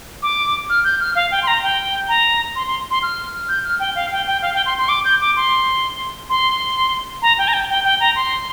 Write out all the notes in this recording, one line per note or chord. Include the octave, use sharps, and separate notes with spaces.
D6
F6
G6
F6
F5
G5
C6
A#5
G5
A#5
C6
C6
C6
F6
G6
F6
G5
F5
G5
G5
F5
G5
C6
C6
D6
G6
D6
C6
C6
A#5
G5
A#5
G5
G5
G5
A#5
C6